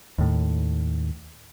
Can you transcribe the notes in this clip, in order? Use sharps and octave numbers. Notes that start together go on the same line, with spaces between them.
D#2 A2